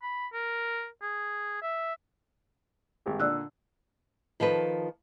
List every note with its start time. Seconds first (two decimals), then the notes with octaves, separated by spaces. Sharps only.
0.03 B5
0.33 A#4
1.02 G#4
1.62 E5
3.06 G#1 G3 G4
3.20 A#2 D3 D5 E6 F#6
4.40 D#3 F3 A4 B4